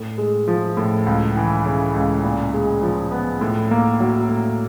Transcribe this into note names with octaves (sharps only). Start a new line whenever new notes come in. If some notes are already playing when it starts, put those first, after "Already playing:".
Already playing: A2
G#3
F3
A2
C#2
E3
C#3
C#2
A#2
G#3
F3
B3
A2
A#3
F#3
A2